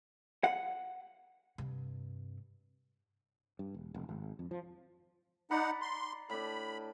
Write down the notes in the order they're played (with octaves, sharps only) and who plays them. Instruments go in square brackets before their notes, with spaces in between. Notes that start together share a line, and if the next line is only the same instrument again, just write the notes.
[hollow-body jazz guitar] F#5
[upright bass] G2 C3
[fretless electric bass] G2
E1
F1
G#1
F2
F3
[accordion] D#4 F#5 [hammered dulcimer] D5 A#5 B5
[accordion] C6
[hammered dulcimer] A2 D4 [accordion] B5